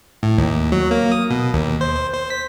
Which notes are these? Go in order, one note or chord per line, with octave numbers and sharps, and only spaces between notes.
A2
D#2
F#3
A#3
D#6
B2
D#2
C5
C5
C5
B6